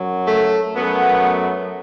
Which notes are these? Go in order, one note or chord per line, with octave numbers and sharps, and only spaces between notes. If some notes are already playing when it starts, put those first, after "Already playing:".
Already playing: F#2 F#3
A3
F#2 F#3 A3 B3